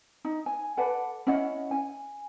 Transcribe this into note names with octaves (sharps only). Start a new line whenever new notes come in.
D#4
G#5
A4 B4 D5 F#5
C#4 E4 D#5 F#5
G#5